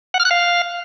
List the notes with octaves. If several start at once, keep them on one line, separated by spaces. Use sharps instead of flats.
F#5
F6
F#6
F5